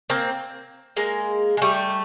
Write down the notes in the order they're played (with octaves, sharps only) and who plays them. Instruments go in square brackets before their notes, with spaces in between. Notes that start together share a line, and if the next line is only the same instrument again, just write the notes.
[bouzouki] A#3 C4
G#3 A#3
G#3
G3 A3